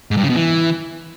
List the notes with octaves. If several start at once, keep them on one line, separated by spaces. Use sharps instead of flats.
G#2
G2
C#3
B2
E3